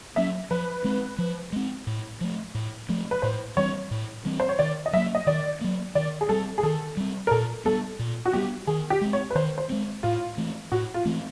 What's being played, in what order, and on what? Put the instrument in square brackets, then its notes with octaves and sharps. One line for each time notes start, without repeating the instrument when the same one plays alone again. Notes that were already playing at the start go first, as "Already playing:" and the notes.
[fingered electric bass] F#3 A#3 C#4 [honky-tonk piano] E5
[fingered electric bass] F3 [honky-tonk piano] B4
[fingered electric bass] G#3 C4
F3
G#3 C4
A2
F3 A3
A2
F3 A3
[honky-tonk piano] B4
[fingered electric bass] A2 [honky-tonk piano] C5
[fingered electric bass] E3 G3 C4 [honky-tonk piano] C#5
[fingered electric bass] A2
E3 G3 C4
[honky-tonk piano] C5
C#5
[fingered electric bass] D#3 [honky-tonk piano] D5
[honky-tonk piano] D#5
[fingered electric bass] F#3 A#3 [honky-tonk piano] E5
[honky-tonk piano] D#5
[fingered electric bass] D#3 [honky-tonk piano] D5
[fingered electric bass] F#3 A#3
[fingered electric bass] D#3 [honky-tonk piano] D5
[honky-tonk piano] G#4
[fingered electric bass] G3 C4 [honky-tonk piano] A4
[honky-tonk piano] G#4
[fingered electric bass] D#3 [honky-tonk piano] A4
[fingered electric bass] G3 C4
[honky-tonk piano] A#4
[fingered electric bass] A#2 [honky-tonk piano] A4
[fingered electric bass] G3 B3 [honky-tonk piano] A4
[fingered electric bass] A#2
[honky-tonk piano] F#4
[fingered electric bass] G3 B3 [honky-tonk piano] G4
[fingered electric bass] D#3 [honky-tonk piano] G#4
[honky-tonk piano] G4
[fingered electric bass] G#3 C4
[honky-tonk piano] C#5
B4
[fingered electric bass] D#3 [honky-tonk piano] C5
[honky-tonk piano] C5
[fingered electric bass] G#3 C4
[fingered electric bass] A2 [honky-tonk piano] F4
[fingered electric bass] E3 A3 C4
[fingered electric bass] A2 [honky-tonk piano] F#4
[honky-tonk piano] F4
[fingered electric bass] E3 A3 C4